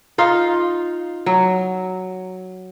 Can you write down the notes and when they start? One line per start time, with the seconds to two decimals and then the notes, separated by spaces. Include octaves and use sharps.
0.18 D#4 F4 F5
1.26 F#3